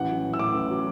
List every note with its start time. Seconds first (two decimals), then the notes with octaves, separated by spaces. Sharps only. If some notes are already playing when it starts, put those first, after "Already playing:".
Already playing: A1 E3 F#5
0.09 F#3
0.24 A1
0.34 E6
0.39 A2 D6
0.55 A1
0.71 F#3